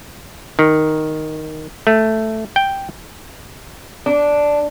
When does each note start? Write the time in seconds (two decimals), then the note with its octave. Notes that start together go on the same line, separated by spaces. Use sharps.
0.59 D#3
1.87 A3
2.56 G5
4.06 D4